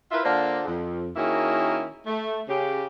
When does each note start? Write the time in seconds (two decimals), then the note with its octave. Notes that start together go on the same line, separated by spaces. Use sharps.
0.11 E4 F4 A#4 B4 E5
0.23 D3 A#3 D4 F4 C5
0.66 F2
1.16 D#3 A#3 C#4 E4 F#4 G#4
2.06 A3
2.48 C#3 G4